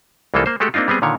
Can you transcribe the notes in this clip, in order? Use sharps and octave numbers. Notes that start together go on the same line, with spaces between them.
C2 E3 G#3 A#3 F4 A4
A#3 C5
G#3 A3 F#4 G4 A4
A#3 C4 D4 D#4 F4
G3 B3 C4 G#4
A#2 D3 D#3 C#5